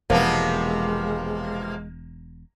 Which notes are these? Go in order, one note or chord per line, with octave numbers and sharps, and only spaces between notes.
E1 C3 F3 G#3 A#3 B3